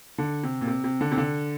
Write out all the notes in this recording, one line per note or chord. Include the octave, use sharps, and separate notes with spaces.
D3
C3
A#2
C3
C3
D3
C3
D3